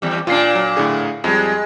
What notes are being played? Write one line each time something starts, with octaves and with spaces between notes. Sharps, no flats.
E2 G3
A#2 D4 F4 C7
F#3
A2 D3 G#4
F2 G3 G#3